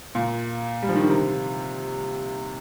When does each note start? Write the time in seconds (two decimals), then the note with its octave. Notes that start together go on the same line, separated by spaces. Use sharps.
0.15 A#2
0.82 G3
0.89 F3
0.96 D#3
1.03 D3
1.10 C3